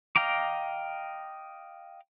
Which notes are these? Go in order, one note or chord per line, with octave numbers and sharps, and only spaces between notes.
D#5 F5 G5 A#5 D6